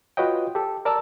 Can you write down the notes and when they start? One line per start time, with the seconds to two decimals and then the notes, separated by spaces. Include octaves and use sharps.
0.17 F4 F#4 B4 C#5 D#5 G5
0.55 G4 A4
0.85 A#4 D5 A5 A#5 E6